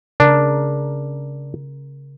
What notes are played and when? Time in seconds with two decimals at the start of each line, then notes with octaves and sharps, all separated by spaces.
0.20 C#3 D4 A#4